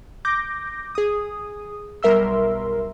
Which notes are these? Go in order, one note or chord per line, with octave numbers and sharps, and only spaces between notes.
D6 G6 A#6
G#4 D#6
B1 G3 A#4 E5 C6 E6